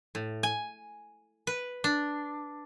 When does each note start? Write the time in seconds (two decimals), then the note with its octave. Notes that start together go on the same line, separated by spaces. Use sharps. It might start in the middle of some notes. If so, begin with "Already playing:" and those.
0.15 A2
0.43 G#5
1.47 B4
1.84 D4